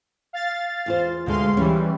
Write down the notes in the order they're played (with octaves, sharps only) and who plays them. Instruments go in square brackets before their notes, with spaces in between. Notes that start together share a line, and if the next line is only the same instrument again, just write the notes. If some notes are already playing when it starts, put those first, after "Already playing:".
[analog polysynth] F5 A6
[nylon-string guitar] E2 F4 C5
[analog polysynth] D2 F5 C6 [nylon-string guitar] B2 D3 G#3
[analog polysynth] E3 G3 [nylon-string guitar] C#4